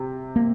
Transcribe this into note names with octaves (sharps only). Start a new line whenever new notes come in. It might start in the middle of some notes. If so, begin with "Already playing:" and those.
Already playing: C3
A#3